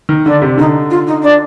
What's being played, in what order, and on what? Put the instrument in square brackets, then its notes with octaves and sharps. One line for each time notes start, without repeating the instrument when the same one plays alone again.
[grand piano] D#3
[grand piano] D3 [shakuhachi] D4
[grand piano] C3
[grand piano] D3 [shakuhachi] D#4
[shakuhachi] F4
D#4
D4